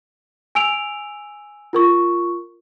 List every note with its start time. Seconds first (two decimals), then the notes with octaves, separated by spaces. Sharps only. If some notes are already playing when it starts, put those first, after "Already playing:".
0.55 G#5 E6 D7 F7
1.73 F4 A#4 C#6